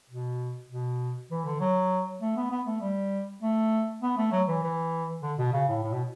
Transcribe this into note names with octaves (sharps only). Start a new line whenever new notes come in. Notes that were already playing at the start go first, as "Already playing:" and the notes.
B2
B2
E3
D3
F#3
A3
B3
B3
A3
G3
A3
B3
A3
F#3
E3
E3
D3
B2
C#3
A2
A2
B2